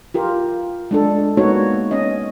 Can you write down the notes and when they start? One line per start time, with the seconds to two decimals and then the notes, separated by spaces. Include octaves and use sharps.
0.14 F4 G4 A#4
0.91 G#3 D4 A4
1.37 G#3 A#3 B3 D#4 F#4 C#5
1.91 C#4 D#5